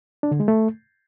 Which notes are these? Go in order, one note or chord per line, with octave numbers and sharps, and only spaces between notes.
D4
D3
G#3
A3